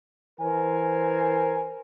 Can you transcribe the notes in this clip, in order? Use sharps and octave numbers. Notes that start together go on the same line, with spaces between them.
E3 A#4 C5 G#5